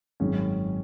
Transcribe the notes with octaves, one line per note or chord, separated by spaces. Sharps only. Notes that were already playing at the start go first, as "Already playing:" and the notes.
G#1 F#2 D#3 G#3 C#4